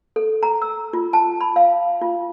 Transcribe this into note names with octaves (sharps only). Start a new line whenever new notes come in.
A4
A#5
E6
F4
A5
B5
F5
F4